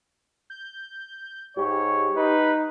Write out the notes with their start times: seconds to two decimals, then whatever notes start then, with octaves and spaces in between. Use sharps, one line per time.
0.50 G6
1.57 G#2 G4 C#5
2.16 D#4 B4